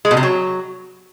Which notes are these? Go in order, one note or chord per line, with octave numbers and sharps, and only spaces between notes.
G#3
B2
C3
F#3